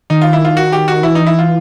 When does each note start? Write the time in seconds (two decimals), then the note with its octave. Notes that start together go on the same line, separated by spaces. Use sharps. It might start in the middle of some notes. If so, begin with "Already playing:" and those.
0.10 D#3 D#4
0.22 F4
0.33 E4
0.45 F4
0.57 F#4
0.72 G4
0.88 F#4
1.03 E3 E4
1.15 D#4
1.27 E4
1.39 F4